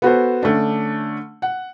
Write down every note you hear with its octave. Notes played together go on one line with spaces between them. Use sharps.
B3 F#4 A4 C5
D3 A3 C#4 D4
F#5